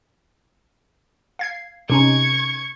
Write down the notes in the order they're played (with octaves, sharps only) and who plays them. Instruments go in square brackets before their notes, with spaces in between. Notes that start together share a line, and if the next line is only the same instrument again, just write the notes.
[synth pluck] F5 G#6 C7
[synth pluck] C3 C#4 D#4 [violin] C#6 G#6